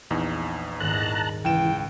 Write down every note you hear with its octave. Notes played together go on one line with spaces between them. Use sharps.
A#1 E2 D#4
D#1 G#2 A5 A#5 F#6
C#2 E3 G5 E7